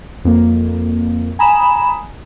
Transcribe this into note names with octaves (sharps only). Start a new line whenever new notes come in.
F2 A#3
G#5 A#5 B5 D#6 E7